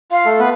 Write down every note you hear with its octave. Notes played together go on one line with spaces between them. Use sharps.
F4 F5
A3 A4
B3 B4